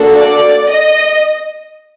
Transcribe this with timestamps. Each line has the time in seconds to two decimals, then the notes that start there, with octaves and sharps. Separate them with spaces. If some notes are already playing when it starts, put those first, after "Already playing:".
Already playing: A#3 D4 F#4 A4
0.15 D5
0.70 D#5